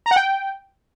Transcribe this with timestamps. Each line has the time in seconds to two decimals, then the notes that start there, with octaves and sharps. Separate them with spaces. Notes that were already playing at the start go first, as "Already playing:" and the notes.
0.06 A#5
0.11 F#5
0.16 G5